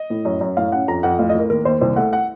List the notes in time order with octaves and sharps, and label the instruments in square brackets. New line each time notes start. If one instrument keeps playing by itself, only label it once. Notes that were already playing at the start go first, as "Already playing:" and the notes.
Already playing: [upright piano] D#5
A2
F#2
F#2
A2 F5
C#4 F#5
F2 A#5
F2 F#5
A1 F5
D#5
A1 A#4
D#2 A#4
D#2 C5
C2 C5
A3 F#5
F#5